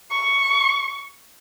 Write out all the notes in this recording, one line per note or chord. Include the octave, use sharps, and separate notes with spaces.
C#6